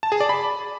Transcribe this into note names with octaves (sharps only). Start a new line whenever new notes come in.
A5
G#4
D5
B5